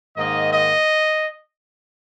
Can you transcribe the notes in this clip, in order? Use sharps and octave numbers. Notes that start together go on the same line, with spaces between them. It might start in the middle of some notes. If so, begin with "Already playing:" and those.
G#2 D#3 A#3 D#4 D#5
D#5